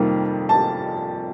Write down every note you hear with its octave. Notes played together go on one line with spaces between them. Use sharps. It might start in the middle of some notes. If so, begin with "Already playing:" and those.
Already playing: F2 C3 D#3 G3 A#3
A5